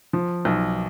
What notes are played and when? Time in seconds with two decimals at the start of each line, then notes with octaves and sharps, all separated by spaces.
0.13 F3
0.45 B1